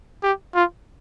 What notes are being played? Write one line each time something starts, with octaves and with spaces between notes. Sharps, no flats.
G4
F4